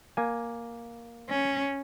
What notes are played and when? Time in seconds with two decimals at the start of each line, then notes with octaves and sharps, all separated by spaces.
0.17 A#3 G#5
1.30 C#4